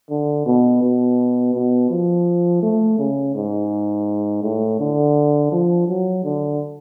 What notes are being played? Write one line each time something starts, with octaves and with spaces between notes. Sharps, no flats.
D3
B2
B2
B2
F3
A3
C#3
G#2
A2
D3
F3
F#3
D3